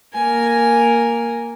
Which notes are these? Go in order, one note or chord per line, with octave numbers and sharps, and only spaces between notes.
A#3 A#4 G#5